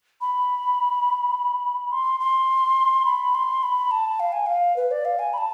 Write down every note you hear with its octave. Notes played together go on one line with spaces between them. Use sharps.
B5
C6
C6
B5
C6
B5
A5
F5
G#5
F5
B4
D5
F5
G#5
B5
A5